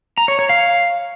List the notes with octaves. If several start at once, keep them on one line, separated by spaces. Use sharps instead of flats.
A#5
C#5
C#5
F5